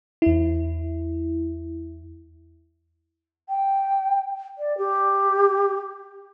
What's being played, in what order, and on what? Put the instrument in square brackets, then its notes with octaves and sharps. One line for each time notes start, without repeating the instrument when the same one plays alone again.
[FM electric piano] E2 E4
[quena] G5
D5
G4